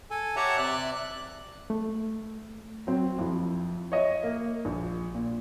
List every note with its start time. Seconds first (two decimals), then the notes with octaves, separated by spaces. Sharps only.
0.10 A4 G#5
0.36 G4 C#5 E5 F#5 A5 A#5
0.57 C3 D5 E5 F#6
0.95 F#6
1.70 A3
2.87 F#3 C4
3.19 F2 E4
3.92 C#5 D#5 E5
4.23 A#3
4.65 A#1
5.15 A#2